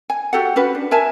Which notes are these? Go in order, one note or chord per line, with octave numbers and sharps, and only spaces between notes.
G#5
F#4 G4 A4 F#5
C#4 F#4 B4
D4
A#4 E5 G#5 A5